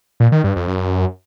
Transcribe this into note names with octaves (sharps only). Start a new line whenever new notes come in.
A#2
D#3
G2
F2
F#2